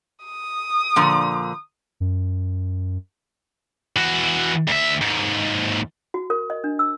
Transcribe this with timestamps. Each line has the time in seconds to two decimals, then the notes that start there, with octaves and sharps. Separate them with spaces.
0.25 D#6
0.96 A#2 D3 F3
2.00 F#2
3.96 E3 F#4
4.68 D2 E5
5.02 D#2 G#2
6.14 F#4
6.30 A#4
6.50 D#5
6.64 D4
6.79 E6